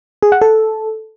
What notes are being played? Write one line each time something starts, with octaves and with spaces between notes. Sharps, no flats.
G#4
F#5
A4